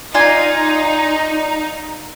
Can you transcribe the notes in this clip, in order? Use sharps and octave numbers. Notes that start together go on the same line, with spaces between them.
D#4 F4 D5 G#5